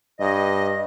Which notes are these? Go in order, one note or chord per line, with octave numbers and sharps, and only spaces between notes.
G2 D#5